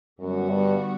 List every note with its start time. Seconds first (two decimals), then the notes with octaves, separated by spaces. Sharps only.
0.20 F#2 D3 G3 B3 F#4
0.49 G2